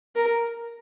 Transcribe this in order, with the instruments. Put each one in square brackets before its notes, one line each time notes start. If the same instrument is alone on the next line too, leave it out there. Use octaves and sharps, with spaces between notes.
[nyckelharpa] A#4